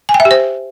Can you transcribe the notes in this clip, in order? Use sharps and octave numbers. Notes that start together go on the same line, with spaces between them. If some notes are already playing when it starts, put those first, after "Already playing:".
G#5
G5
E5
G4
C5